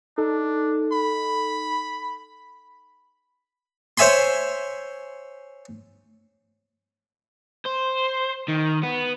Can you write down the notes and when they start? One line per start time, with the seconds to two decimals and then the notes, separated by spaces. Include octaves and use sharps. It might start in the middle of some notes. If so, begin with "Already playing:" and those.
0.18 D4 D#4 A4
0.93 B5
3.98 C5 C#5 E5 G#5 B5 C6
7.65 C5
8.48 D#3
8.83 B3